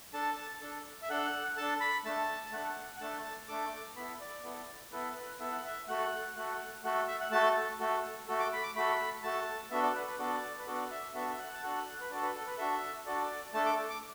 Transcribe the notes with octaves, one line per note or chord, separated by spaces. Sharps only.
D4 A4 A5
D4 A4
E5
D4 A4 F#5
D4 A4 A5
B5
A3 D4 A4 A5
A5
A3 D4 A4 F#5
F#5
A3 D4 A4 A5
A3 D4 A4 D6
B3 E4 A4 B5
D5
B3 E4 A4
B3 E4 A4 B4
B4
B3 E4 A4 E5
F#5
E5
A3 F#4 A4 F#5
A3 F#4 A4 F#5
A3 F#4 A4 F#5
E5
F#5
A3 F#4 A4 A5
A3 F#4 A4
A3 F#4 A4
D6
B5
D6
A3 F#4 A4 B5
A3 F#4 A4 A5
B3 D4 F#4 A4 E5
D5
B4
B4
B3 D4 F#4 A4 D5
B4
B3 D4 F#4 A4 D5
E5
B3 D4 F#4 A4 E5
E5
F#5
A5
D4 F#4 A4 F#5
B4
D4 F#4 A4 D5
B4
A4
B4
D4 F#4 A4 E5
D4 F#4 A4 D5
A3 D4 A4 A5
D6
D6